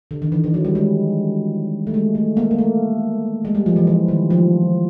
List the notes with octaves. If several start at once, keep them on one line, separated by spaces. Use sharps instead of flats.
D3
D#3
E3
E3
F#3
G3
G#3
A3
G#3
A3
A#3
A#3
A3
G#3
G3
F3
E3
E3
D#3
F3